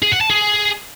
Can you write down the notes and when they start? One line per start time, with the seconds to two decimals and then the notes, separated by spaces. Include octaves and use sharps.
0.02 G#4
0.12 F#5
0.21 A5
0.30 G#4